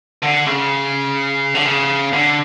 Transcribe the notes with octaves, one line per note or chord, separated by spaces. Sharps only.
D3
C#3
D3
C#3
D3